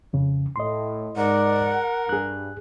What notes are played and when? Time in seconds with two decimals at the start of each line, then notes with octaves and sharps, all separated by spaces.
0.13 F2 C#3
0.56 A2 D#5 C6
1.16 G#2 A#4 D5 F#5
2.09 G2 G#4 F#6